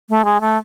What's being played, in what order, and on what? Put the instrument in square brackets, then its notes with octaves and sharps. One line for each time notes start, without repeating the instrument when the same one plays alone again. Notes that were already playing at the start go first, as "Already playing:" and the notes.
[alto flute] A3
G#3
A3